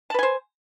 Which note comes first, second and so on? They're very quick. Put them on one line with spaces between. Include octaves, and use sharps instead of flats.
A5 B4 G#5 C5